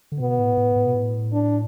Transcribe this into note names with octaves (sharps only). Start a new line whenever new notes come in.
D3
B2 B3
A2
A2
A2
B2
A2
D4